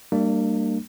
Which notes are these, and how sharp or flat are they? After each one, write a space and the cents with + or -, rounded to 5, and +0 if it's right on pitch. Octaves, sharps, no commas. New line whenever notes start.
G3 +0 A#3 -30 D4 +35